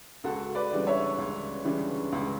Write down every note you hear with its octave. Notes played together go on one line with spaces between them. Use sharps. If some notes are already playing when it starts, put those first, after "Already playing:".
C#2 F#4 A4
B4 D5
C#3 E3 G3 D4
C#5 E5
C#2
C#3 E3 G3 D4
C#2